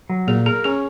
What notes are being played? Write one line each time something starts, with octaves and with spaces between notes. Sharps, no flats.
F#3
A#2 G#4
G#4 A#4
C#4 G#4